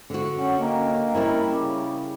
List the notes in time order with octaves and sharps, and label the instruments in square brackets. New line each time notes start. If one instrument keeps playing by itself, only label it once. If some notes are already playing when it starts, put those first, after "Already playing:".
[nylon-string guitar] D3 F#4
[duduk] C#4 [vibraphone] F#5
[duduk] A#3 [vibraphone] D#5 G5 A#5
[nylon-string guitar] G3 C#4 E4 [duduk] A#4
[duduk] C#3 [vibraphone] D6